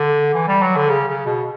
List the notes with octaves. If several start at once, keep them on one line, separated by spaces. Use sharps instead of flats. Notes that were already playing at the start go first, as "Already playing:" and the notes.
Already playing: D3
E3
G3
F#3
D3
C#3
C#3
B2